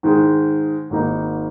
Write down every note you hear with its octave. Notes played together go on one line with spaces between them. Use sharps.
G#2 D#3 G#3
G#1 G#2 D#3 A#3 D#4